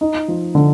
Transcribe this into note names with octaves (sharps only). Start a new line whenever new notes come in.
D#4
F3
D3